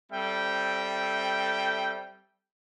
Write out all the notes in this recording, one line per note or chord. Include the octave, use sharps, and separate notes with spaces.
G3 C4 A4 E5 G5